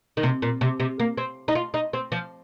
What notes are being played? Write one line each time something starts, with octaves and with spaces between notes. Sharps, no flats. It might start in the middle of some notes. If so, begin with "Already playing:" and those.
D#3
C3
A#2
C3
C3
A#3
C4
D#4
F4
D#4
C4
F3